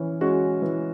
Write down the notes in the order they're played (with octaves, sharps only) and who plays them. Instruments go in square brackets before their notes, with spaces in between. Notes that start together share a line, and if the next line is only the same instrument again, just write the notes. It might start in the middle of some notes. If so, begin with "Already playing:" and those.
Already playing: [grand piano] E3 C#4
G#3 C#4 F#4
E3